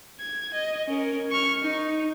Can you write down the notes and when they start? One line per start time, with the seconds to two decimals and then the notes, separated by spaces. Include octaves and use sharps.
0.21 G#6
0.54 D#5
0.87 C#4 A#4
1.31 C#6 F6
1.63 D#4